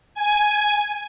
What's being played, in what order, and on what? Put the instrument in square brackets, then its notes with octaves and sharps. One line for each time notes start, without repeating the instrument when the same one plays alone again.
[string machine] G#5